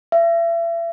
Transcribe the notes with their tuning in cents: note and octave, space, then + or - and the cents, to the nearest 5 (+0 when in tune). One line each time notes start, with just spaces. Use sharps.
E5 +35